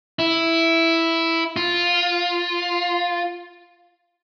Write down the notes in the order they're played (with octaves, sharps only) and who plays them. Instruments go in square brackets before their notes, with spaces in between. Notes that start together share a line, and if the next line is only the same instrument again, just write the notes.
[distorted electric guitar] E4
F4